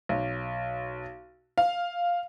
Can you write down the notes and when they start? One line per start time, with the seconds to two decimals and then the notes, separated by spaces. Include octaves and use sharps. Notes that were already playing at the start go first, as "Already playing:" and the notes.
0.09 B1
1.58 F5